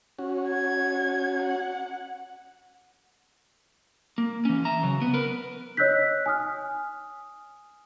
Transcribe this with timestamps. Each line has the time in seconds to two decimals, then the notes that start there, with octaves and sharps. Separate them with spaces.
0.19 C#4 F#4
0.48 G#6
1.42 F#5
4.18 A#3
4.45 E3 C#4
4.65 E5 A#5
4.83 C#3 F#3
5.02 B3
5.14 A#4 B4
5.77 C#5 D#5 E6 F#6 G6 B6
6.26 G#5 D#6 F6